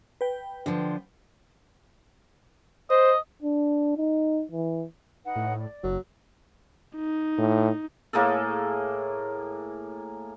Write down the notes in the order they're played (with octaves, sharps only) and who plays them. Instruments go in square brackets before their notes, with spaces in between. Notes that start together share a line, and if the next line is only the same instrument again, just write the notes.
[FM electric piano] B4 G5
[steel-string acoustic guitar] D3 F3
[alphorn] C5 [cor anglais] D#5
[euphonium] D4
D#4
E3
[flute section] D#4 B4 F#5
[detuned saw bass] A2
[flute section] D5
[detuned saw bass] F#1 [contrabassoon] F#3
[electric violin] D#4
[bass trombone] A2
[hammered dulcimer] A2 A#3 G#4 A4